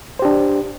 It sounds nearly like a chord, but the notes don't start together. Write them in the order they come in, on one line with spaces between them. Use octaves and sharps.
C5 G4 D4